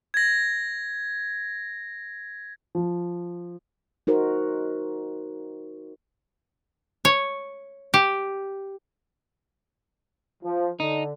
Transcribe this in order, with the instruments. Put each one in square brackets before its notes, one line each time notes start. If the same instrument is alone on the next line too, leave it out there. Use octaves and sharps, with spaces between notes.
[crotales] G#6 A#6
[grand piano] F3
[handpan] D#4 F#4 A#4 C5
[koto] C#5
G4
[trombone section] F3
[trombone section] D3 [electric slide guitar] D#4